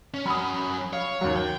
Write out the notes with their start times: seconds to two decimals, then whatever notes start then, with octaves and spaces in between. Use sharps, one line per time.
0.14 C#4
0.26 F#3 C#4 B5 D#6
0.93 C#5 F5
1.21 D#2 F#3
1.36 G5